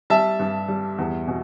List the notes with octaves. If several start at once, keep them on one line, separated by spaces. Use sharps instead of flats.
G3 E5 A5
G2
G3
E2
B2